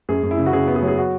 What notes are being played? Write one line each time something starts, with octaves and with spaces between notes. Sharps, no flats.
F#2 G#4
F#2
E4
C#3
F#4
C#3 G#4
B3
G#4
F#3
G#4
F#4